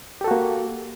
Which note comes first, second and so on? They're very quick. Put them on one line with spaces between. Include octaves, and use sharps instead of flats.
G4 A4 F#4 A#3